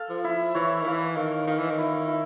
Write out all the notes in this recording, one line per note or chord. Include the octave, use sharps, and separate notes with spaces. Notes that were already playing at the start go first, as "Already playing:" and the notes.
Already playing: A4 F5
F3
E4
E3 C#5
D#3
E3 F5
D#3 F5
D#3 F5
E3
D#3
E4
E4